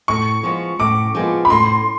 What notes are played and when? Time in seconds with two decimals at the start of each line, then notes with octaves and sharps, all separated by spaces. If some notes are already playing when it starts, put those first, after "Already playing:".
0.08 A2 C#6
0.43 F3 G#3 B3
0.79 A2 D6
1.15 F3 G#3 B3
1.45 B5
1.50 A2 C6